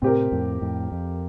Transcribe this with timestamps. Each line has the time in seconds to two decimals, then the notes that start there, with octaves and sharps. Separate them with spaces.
0.02 A2 C3 C4 G4 A#4
0.32 F2 A2
0.61 F2 A2
0.92 F2